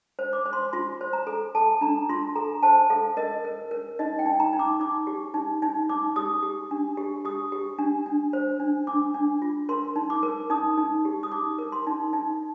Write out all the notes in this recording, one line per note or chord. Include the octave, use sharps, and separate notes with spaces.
C5
D6
C5
C6
F4 C6
C5
A#5
A4
A4 A5
D4 A#5
F4 C6
A4 A#5
C5 A5
A4 F5
A#4 D#5
A#4
A#4
D#4 D#5
G5
D#4
A#5
D#4
D6
D#4 D6
G4
D#4
D#4
D#4 D6
G4 D#6
G4
D4
G4
G4 D#6
G4
D4
D4
C5
D4
D4 D6
D4
F4
A#4 C6
D#4
D6
A#4
D#4 D#6
D#4
G4
D#6
D#4 D6
A#4
C6
D#4
D#4